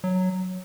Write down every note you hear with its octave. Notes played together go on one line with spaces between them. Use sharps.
F#3